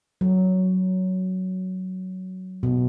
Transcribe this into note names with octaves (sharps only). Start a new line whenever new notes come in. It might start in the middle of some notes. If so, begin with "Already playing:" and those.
F#3
B2